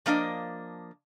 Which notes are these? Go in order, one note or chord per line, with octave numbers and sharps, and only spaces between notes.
F3 A#3 D4 D#5